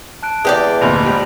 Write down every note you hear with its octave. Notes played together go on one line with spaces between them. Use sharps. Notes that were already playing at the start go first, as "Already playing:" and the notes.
A5 F#6 D7
E2 G#3 G4 G#4 D5 D#6 G6
F1 D2 A#2 B5 A#6 F7
D#1 G#2 G3